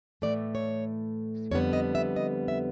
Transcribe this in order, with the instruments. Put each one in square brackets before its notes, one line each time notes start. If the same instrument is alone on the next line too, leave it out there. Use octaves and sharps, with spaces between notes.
[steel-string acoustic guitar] A2 E3 A3 D5
C#5
F2 D3 G3 B3 C#5
D#5
E5
D#5
E5